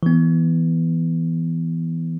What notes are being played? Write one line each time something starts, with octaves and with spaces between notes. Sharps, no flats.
E3 B3